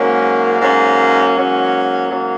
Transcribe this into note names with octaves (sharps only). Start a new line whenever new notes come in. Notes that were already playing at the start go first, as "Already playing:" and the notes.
Already playing: G#2 F#3 A#3 C#4
G#2 F#3 A#3 C#4
G#2 F#3 A#3 C#4
G#2 F#3 A#3 C#4